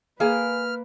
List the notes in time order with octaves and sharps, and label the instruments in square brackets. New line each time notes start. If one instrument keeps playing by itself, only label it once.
[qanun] A#3 [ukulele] G#4 G#5 [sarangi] B4 [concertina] F6